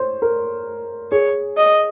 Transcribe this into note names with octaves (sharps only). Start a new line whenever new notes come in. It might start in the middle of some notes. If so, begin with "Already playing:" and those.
Already playing: C5 C#5
A#4
G#4 C#5
D#5